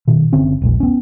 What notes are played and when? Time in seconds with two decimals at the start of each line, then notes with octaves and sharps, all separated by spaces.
0.08 B2 D#3
0.32 F#1 D3 C4 C#4
0.62 E1 A#1 G#3
0.80 B3 C#4